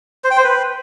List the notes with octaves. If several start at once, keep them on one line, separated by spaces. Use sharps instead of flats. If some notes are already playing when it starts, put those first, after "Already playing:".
C5
G5
C5
B4